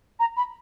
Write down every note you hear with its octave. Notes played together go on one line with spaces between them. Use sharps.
A#5
B5